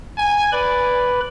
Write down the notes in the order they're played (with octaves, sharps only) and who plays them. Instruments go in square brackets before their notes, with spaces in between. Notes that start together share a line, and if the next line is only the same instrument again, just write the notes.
[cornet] G#5
[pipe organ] B4 B5 [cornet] D5